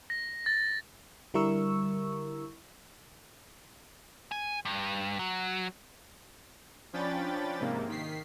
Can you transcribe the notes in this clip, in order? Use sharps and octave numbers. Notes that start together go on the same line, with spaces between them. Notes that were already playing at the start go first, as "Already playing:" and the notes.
A#6
A6
D3 G3 E4 A#4 C#6 E6
G#5
G2
F#3
F3 C#4 D4 G5 B5 A6
G#2 C3 A#3
D#3 B6 C7